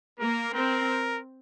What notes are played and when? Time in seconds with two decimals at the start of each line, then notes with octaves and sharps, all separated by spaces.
0.20 A#3 A#4
0.54 C4 A#4